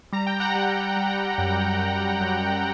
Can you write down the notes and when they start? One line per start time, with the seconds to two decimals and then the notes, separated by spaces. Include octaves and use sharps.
0.13 G3 A#5
0.27 G5
0.40 F#5 A#5
0.54 G3 F#5 A#5
0.97 G3
1.38 F#2
1.79 F#2
2.21 F#2